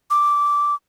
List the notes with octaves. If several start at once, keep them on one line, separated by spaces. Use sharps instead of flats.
D6